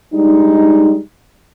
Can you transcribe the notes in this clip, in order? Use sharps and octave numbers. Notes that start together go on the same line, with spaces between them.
G3 G#3 D4 D#4